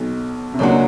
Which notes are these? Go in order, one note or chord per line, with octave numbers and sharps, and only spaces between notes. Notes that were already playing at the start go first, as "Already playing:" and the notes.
Already playing: B1 B2 F#3
C3
C#2 C#3 F#3 A#3 D4 F#4